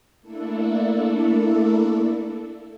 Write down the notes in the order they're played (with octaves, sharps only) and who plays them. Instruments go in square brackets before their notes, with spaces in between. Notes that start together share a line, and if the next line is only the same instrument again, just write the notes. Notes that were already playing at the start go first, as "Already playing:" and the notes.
[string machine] A3 A#3 D4 E4 A4